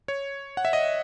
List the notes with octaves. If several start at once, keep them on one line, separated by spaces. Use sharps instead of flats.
C#5
F#5
E5
D#5